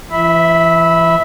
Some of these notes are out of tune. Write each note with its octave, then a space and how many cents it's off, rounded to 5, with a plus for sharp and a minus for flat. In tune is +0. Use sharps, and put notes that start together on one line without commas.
E3 +35 E5 -15 B5 +0